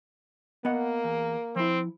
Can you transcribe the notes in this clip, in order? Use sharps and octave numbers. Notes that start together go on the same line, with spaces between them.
A#3 B3 D#5 F#5
E2
F3 C4 E4